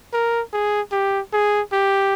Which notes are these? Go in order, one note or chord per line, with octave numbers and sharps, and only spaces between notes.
A#4
G#4
G4
G#4
G4